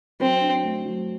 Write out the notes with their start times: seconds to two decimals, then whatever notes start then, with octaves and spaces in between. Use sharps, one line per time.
0.20 F#3 C4
0.41 D4
0.63 A3
0.86 F#3